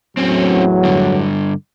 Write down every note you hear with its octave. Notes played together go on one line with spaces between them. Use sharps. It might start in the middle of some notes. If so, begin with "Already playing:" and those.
E2 A2 F#3 C4 C#4
G2 D3